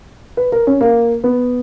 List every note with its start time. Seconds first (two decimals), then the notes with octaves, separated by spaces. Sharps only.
0.37 B4
0.52 A#4
0.67 C#4
0.81 A#3
1.24 B3